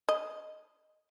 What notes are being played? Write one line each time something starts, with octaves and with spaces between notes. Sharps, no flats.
D#5